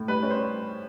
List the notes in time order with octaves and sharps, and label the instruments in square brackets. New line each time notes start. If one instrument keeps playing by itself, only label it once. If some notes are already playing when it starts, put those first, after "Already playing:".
Already playing: [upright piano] A2
G3 B4
C#4
C5